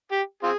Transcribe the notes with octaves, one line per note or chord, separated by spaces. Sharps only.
G4
C4 F4 G#4